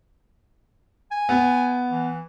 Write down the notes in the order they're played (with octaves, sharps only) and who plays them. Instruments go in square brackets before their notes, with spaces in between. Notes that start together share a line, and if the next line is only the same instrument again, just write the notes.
[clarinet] G#5
[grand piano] B3
[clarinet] E3